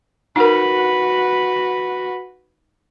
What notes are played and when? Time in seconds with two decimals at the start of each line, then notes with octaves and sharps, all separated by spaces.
0.36 D#4 F#4 A#4 B4